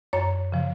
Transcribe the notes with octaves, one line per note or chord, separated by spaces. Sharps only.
F#2 C#5
C#3 F3